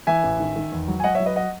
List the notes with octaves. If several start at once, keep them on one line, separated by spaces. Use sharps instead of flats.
E3 E5 G#5
A1
D#3
D#3
E2
F#3
G#5
F#3 D#5 F#5
C#5 E5
F#3
B4 D#5
D#5 F#5